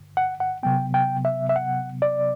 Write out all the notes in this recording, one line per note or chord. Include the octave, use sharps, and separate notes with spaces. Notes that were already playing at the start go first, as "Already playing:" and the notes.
Already playing: G2 D3
F#5
F#5
C3 F#3 B3 G5
G5
E5
E5
F#5
D5